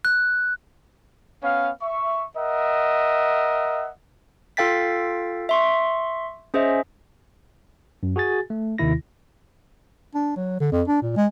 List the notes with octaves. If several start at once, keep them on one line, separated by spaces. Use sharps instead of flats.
F#6
B3 C#4 F5
E5 C#6
A#4 D#5 E5 F#5
F4 A4 F5 G5 A6 B6
E5 C6 C#6
C#4 G#4 C5 D#5 E5
F#2
F#4 G#4 G#5 A6
A3
D#2 C3 D#3 E4 A#6
D4
F#3
D3
F2
D4
A#2
G#3